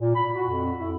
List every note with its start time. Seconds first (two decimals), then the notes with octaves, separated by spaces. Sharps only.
0.01 A#2
0.16 B5
0.36 F#4
0.49 F2
0.80 E4